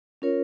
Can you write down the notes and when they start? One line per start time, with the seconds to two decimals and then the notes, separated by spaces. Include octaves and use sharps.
0.22 C#4 F4 A#4 C#5